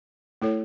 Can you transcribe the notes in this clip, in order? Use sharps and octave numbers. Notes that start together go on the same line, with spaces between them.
A3 E4 A4 C#5